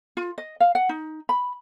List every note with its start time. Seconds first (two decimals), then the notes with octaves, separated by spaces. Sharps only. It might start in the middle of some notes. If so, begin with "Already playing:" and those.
0.17 F4
0.38 D#5
0.60 F5
0.75 F#5
0.89 D#4
1.29 B5